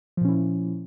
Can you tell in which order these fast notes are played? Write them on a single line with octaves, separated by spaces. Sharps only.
F3 A#2 C#4 E4